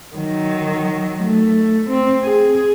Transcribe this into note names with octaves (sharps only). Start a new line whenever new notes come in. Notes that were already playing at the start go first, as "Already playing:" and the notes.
D#3 F#3
A3
C4
G#4